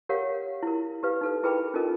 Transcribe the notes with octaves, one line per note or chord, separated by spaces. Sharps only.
G4 A#4 C#5 F5 F#5
E4 A#4
G4 B4 F5
D#4 A4 B4
E4 G#4 A#4 B4 G5 B5
C#4 D#4 F4 A4 A#4 D#5